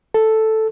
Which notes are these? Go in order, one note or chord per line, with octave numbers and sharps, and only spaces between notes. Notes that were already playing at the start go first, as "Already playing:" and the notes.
A4